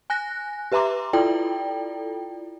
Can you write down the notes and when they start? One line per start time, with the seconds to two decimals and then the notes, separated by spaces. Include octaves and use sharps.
0.10 G#5 F#6 A#6
0.72 G4 B4 E5 A#5 C6 D6
1.13 E4 F4 A4 D5 G5